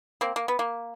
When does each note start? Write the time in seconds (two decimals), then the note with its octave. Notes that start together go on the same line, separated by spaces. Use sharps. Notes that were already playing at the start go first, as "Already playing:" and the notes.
0.21 A#3 C4
0.36 A#3
0.48 B3
0.59 A#3